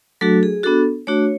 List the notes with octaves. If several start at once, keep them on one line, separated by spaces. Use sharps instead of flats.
F#3 A3 D4 F#4 A4
G#4
B3 D4 F#4 A4
A3 D4 F#4 C#5